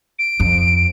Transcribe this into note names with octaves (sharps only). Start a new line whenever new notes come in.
D7
F2